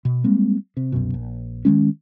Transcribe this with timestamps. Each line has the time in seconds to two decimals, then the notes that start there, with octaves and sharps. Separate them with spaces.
0.05 B2
0.24 G3 G#3 A#3 C4
0.77 C3
0.92 C2 F#2 B2
1.14 A#1
1.65 D#3 E3 G#3 C#4